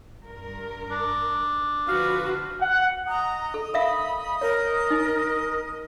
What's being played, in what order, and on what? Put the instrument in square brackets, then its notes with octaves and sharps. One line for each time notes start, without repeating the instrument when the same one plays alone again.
[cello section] G2 A#4
[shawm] D4
[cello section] D3 F3 B4 [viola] F#4 [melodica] F5
[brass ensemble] F#5
[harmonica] D#5 D#6 [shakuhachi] A#5
[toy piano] A4
[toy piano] A#4 E5 F5 [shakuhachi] B5
[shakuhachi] A#4 [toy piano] C#5
[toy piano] D#4